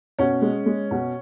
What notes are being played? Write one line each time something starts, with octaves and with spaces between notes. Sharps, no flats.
B2 C#4
G#3
G#3
B2